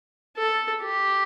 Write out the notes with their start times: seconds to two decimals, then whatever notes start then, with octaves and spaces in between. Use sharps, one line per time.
0.37 A4
0.83 G4